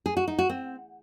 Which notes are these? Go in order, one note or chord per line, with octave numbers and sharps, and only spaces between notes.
G#4
F#4
D#4
F#4
C4